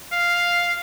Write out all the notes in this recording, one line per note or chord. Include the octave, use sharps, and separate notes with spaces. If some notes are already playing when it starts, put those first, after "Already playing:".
F5